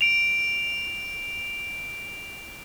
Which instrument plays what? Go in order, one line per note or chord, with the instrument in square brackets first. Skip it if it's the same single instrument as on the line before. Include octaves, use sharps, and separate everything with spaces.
[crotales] D7 F7